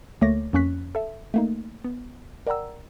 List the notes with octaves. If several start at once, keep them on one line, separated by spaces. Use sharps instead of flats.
D2 A3 A#3 C#5 D6 A#6
F2 A#3 C#4 C#6 F#6 B6
A4 E5
A3 A#3 D#4
B3
A#4 D5 F#5 G5 A#5 E6